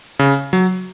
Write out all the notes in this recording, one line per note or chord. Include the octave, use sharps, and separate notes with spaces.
C#3
F#3